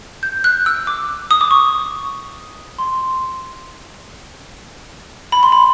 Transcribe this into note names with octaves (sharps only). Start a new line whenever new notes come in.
G6
F#6
E6
D6
D#6
D6
C#6
C6
B5
C6
B5